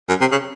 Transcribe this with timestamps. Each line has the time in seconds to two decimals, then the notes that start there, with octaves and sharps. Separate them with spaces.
0.09 F#2
0.21 C3
0.31 C#3